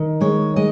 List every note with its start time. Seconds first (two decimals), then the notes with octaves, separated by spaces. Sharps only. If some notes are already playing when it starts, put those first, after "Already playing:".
Already playing: D#3
0.21 G#3 C#5
0.56 G#3 D#5